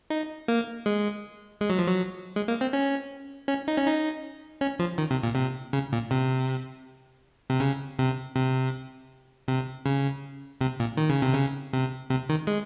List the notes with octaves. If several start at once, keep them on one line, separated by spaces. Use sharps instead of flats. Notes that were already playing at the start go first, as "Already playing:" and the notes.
D#4
A#3
G#3
G#3
F#3
F3
F#3
G#3
A#3
C4
C#4
C#4
D#4
C#4
D#4
C#4
F3
D#3
C3
A#2
C3
C#3
A#2
C3
C3
C#3
C3
C3
C3
C#3
C3
A#2
D#3
C#3
C3
C#3
C3
C3
D#3
G#3